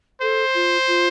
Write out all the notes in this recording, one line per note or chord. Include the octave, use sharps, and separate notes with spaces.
A4 C5
F4
F4